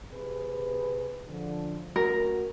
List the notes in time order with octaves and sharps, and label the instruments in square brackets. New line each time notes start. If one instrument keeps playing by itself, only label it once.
[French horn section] C3 G#4 B4
D3 F3
[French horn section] A3 C#4 F#4 [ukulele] A#4